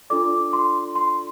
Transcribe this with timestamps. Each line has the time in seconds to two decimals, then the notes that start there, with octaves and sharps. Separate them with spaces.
0.10 D4 F4 A4 D5 D6
0.53 C6
0.95 C6